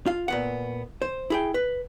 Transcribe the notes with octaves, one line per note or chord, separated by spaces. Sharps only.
F4 F5
A#2 B3 F#5
C5
E4 G#4 G5
B4